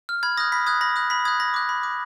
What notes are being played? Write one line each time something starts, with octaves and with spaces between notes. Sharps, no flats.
F6
B5 G#6
D#6 F#6 A#6
B5 B6
D#6 F#6 G#6
B5 A#6
D#6 F#6
B5 B6
D#6 F#6 G#6
B5 A#6
D6 F#6
B5
D6 F#6